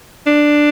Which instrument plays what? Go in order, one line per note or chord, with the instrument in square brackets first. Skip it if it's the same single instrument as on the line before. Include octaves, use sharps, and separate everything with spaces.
[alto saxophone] D4